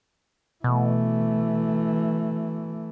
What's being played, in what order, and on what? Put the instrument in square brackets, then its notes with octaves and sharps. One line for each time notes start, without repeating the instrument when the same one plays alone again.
[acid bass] B2 [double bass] E3 A3